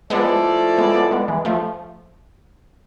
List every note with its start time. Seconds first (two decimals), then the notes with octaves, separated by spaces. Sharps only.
0.10 F3 G#3 A3 B3 E4 A4 D5
0.77 G#3 B3
0.95 G#3 B3
1.11 G#3 B3
1.28 E3 G#3
1.45 F3 A3